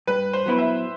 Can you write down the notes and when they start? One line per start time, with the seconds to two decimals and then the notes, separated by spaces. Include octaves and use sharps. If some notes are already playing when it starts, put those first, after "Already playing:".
0.07 G2 B4
0.33 C5
0.46 F#3 B3 E4 B4
0.59 E5